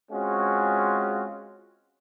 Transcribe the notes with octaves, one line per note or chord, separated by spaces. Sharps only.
G#3 C4 C#4 F4 F#4